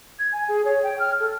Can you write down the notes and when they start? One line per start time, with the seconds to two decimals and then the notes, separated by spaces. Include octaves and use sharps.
0.19 G#6
0.32 G#5
0.48 G#4
0.65 C#5
0.83 G5
0.99 F6
1.20 A4